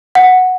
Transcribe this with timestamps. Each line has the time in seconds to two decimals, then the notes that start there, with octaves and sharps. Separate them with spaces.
0.15 F#5